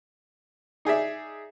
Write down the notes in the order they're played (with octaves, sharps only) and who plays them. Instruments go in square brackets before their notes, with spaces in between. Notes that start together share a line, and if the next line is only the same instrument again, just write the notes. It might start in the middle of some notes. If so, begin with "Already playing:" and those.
[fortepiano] D#4 G#4 D5 E5